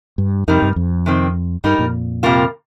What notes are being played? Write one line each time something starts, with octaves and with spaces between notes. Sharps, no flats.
G2
F2 C3 G3 D#4 A#4
G2
F2
C3 D#3 C4
G2 G3 D#4 A#4
F2 A#2
C3 G3 A#3 F4 A#4